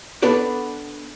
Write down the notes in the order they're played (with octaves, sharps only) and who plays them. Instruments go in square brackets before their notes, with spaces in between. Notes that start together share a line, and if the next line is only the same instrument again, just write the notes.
[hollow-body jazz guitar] B3 D4 A4 B4 D5